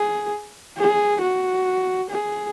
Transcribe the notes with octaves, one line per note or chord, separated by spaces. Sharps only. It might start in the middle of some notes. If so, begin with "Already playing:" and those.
Already playing: G#4
G#4
F#4
G#4